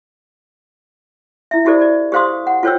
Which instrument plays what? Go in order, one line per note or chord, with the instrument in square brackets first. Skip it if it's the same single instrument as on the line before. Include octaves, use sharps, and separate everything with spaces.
[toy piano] E4 E5
E4 F#4 G4 A4 C5 D5
D5
G4 A4 C5 F5 C6 D#6
F#5
F4 A4 C5 C#5 G5 E6